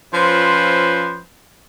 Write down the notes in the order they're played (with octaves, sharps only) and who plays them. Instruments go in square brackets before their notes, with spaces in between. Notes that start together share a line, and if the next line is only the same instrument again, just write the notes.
[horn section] F3 C#4 F4 B4 C5